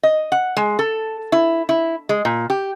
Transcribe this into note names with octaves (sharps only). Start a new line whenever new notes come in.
D#5
F#5
G#3
A4
E4
E4
G#3
A#2
G4